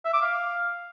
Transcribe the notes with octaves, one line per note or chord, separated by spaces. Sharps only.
E5
D6
F5